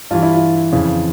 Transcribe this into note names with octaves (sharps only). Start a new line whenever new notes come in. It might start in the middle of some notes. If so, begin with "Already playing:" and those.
G2 E3 F4
E4
F4
F2 C#3 E3